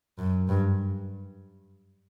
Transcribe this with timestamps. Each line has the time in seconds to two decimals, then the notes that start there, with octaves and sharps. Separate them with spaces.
0.19 F#2
0.49 G2